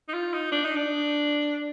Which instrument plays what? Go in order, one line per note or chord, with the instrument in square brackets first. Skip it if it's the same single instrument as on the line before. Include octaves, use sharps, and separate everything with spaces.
[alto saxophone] D#4
F4
D#4
D4
D#4
D4